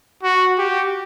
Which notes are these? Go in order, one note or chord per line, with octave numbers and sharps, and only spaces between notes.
F#4
G4